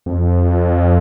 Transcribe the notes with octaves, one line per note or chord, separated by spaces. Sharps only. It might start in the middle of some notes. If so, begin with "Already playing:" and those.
F2